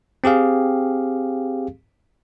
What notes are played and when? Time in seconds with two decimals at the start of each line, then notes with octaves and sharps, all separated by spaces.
0.24 C4 G4 G#4 F5